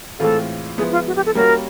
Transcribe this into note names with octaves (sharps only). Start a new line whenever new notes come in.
A2 E3 G#3 C4 F4 A4
F3 G#3 B3 E4 G#4
F4
F#4
G4
A4
G3 A#3 C#4 F#4 A#4